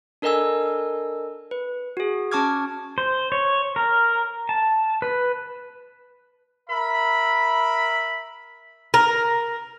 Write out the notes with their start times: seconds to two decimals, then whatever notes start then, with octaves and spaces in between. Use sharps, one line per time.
0.22 D4 A4 A#4 D#5 G#5 E6
1.51 B4
1.97 F#4 G#4
2.32 C#4 A5 C#6 D6 F6 G#6
2.98 C5
3.32 C#5
3.76 A#4
4.49 A5
5.02 B4
6.69 A#4 E5 B5
8.94 A#4